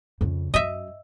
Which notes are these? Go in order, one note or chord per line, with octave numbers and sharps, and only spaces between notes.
F2 C#3
F#2 D#5 E5